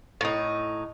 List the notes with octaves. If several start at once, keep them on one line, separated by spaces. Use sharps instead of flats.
A2 D#4